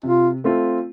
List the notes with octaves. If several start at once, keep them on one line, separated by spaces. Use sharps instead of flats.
C3 F4
A3 C4 F4